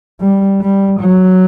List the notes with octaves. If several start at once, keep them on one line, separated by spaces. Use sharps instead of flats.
G3
G3
F#3